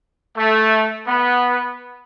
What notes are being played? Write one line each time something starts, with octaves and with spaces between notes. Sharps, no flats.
A3
B3